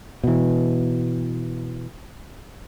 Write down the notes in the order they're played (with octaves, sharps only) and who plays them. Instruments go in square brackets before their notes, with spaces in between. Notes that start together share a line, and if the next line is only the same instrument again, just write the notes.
[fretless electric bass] B2 E3